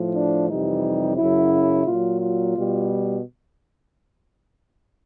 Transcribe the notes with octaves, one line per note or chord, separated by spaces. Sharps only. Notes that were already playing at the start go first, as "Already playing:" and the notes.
Already playing: A2 F3
D4
F2 C3 E3 G3 D#4
F#2 C#3 F#3 E4
A#2 F#3 F4
F4
B2 G3